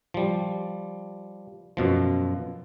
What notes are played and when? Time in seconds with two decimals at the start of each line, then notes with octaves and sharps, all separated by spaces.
0.14 F3 G3
1.77 F#2 B2 F3